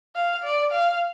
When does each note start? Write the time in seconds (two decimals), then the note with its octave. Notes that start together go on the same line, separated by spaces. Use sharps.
0.16 F5
0.43 D5
0.72 F5